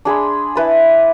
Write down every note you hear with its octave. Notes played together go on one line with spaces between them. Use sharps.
D4 G#4 B5 C6
E4 B4 A5